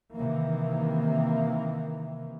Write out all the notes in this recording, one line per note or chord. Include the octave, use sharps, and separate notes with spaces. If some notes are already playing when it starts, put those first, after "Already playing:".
C3 D#3 E3 A#3